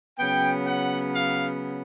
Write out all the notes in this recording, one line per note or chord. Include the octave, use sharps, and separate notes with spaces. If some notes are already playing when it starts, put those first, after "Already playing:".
C#3 F#3 B3 G5
F#5
F5